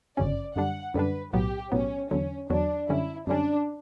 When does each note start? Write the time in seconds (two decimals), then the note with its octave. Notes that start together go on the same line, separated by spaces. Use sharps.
0.17 G1 F#2 C#3 F#3 C#4 D5
0.56 F#2 D3 G3 D4 F#5
0.94 F#2 D3 G3 D4 B4
1.33 B1 A2 F#3 B3 G4
1.72 B1 A2 F#3 B3 C#4
2.11 E2 D3 F#3 C#4
2.50 E2 D3 F#3 D4
2.89 F#2 D3 G3 C#4 E4
3.27 F#2 D3 G3 C#4 D4